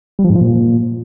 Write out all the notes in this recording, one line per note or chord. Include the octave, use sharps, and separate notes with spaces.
G3
F3
G#2
F3
A#2